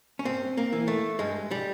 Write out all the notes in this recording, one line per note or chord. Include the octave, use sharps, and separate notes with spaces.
C#4
G2 C4
A#3
E3
A3
G2 G#3
G3